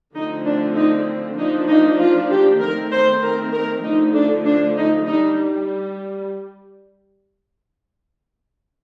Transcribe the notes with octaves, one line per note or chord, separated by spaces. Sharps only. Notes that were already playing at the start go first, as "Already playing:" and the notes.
D3 F3 A3 C4 D#4
D4
D#4
F3 A#3 D4 D#4
D#4
F4
G4
D#3 A3 C4 A#4
C5
A#4
A#4
D3 F3 A3 D#4
D4
D4
D#4
G3 D4 D#4